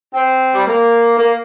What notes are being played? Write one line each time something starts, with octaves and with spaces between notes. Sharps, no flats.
C4
G3
A#3
A#3